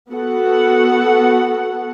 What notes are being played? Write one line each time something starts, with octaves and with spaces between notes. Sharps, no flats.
B3 F#4 A4 F#5